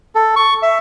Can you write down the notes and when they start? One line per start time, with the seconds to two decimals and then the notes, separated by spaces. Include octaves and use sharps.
0.15 A4
0.36 C#6
0.62 E5